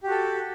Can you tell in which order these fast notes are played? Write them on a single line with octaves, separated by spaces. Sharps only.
G4 F#4 A4